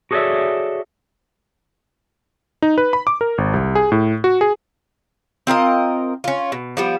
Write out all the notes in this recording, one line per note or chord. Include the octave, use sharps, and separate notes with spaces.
F#4 G#4 A4 C#5 D5 E5
D#4
B4
B5
D6
A#4
G#1
C2
G#4
A2
F#4
G#4
C4 F4 A#4 D#5
C#4 F4
B2
F3 G3 B3